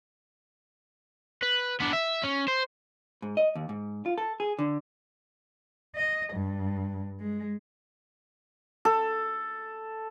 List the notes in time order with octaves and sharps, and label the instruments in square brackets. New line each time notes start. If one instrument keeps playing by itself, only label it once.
[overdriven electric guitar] B4
B3 D4
E5
C#4
C5
[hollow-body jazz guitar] G#2
D#5
D#2
G#2
F4
A4
G#4
D3
[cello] D#5
G2
G#3
[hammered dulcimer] A4